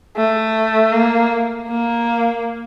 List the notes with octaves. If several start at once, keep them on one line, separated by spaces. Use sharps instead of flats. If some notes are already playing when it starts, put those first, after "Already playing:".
A3
A#3
A#3